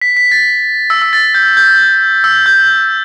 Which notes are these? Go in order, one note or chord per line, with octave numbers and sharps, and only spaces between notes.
B6
B6
A6
E6
E6
A6
A6
G6
G6
E6
G6